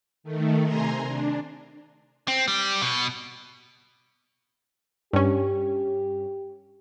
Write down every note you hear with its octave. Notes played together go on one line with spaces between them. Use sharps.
D#3 A3
C3 G#5 A#5 C6
D4
C4
G3
B2
G2 C#4 G4